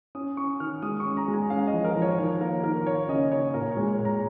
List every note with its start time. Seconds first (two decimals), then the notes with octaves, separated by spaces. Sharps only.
0.15 C#4 D#6
0.37 C#4 C#6
0.60 D#3 F6
0.82 G#3 D#6
1.00 C#6
1.06 C#4
1.17 A#5
1.28 G#3
1.34 G#5
1.50 C#4 F5
1.67 D#5
1.73 F3
1.84 A#4
1.96 F3
2.02 C#5
2.18 D#3 C#5
2.41 A#3 A#4
2.64 D#3 A#4
2.86 A#3 C#5
3.09 C#3 D#5
3.31 D#4 C#5
3.54 A#2 A#4
3.71 C#5
3.77 G#3
3.88 C#5
3.99 A#2
4.05 A#5